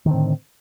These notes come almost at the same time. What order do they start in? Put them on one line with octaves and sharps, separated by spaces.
D#3 D3 C4 A2